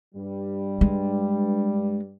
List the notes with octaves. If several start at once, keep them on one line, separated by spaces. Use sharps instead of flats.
G2 G3
G#3